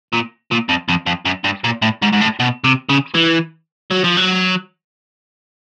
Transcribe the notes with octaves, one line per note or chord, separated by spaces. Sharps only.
A#2
A#2
F2
F2
F2
F#2
G2
A#2
A2
G#2
G#2
A2
B2
C3
C#3
E3
F#3
F3
F#3